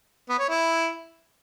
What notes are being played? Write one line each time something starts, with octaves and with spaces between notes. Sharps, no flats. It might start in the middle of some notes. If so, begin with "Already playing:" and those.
B3
C#5
E4